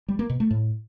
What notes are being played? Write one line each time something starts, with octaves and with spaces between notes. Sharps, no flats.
G3
A#3
B2
A3
A2